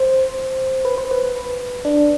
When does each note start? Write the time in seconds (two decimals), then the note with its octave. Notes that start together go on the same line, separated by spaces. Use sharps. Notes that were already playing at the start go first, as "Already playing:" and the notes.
Already playing: C5
0.85 B4
0.98 C5
1.11 B4
1.85 D4